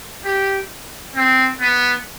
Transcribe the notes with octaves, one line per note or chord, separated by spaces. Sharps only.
G4
C4
B3